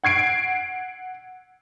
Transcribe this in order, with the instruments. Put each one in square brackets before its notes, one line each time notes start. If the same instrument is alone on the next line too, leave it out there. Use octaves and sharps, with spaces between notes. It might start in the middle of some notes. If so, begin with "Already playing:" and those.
[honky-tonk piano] F#5 G#6 C7 D7